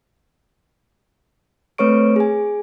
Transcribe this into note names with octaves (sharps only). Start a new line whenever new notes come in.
A3 C4 B4 C#5 C#6 D7
G#4 G#5